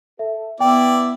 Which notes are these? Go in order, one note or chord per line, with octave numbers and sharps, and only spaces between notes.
A4 E5
B3 E4 D5 G5